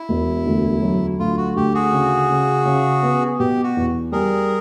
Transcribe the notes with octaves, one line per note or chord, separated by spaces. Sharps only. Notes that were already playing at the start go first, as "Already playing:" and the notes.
Already playing: E4
E1
D2
F#3
D2 F4
F#4
D2 G4
F#4 G#4
C#3
C#3
C#3
B3
B2 G4
F#4
E2
G3 G#4 A#4